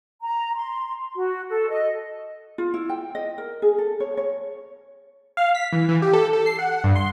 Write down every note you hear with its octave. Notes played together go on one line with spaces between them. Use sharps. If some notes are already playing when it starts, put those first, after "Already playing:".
A#5
C6
F#4
A4
D#5
F4
E4
G5
D#5
A#4
G#4
A4
C#5
C#5
F5
B6
E3
E3
G4
A4
A4
C7
F#5
G2
C6